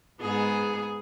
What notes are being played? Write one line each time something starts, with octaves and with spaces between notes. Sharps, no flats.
G#2 B3 G#4